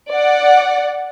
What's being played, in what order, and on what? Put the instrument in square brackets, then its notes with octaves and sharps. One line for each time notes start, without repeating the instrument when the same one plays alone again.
[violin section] D5 F#5